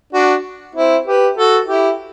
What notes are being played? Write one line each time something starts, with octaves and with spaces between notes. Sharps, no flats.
D4 F#4
C4 E4
G4 B4
F#4 A4
E4 G4